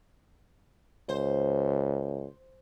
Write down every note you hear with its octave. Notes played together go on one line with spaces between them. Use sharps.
C#2 C5